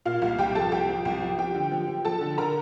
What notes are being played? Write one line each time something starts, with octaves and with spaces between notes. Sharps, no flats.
A#2 F4 F5
C2 F4 F5
C2 G4 G5
F3 A4 A5
C2 G4 G5
F3
C2
F3
F3 G4 G5
D3
F3
F3
F3 A4 A5
D3
D3 A#4 A#5